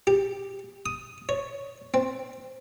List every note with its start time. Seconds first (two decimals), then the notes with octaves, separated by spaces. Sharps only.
0.07 G4
0.86 D#6
1.29 C#5
1.94 C4